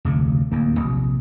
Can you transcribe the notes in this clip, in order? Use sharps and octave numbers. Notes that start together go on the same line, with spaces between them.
F1 D2 C#3
D1 D#2 A#3
A#1 C3